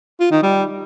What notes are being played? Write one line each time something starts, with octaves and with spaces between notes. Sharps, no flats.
F4
D#3
G3